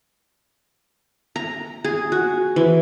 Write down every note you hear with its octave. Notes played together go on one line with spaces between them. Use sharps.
A#5
G#4
F#4
E3